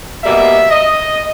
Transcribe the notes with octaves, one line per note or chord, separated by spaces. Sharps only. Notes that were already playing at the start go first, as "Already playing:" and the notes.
B2 G3 A#3 E5
D#5